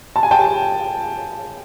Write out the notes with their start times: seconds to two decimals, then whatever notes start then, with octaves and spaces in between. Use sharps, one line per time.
0.16 A5
0.23 G#5
0.31 G5 A5